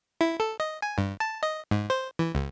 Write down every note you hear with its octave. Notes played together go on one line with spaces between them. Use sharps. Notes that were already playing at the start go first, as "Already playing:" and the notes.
E4
A4
D#5
G#5
G2
A5
D#5
G#2
C5
E3
C#2